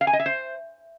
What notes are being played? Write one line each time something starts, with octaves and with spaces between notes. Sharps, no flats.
F5
G#5
D#5
E5
C5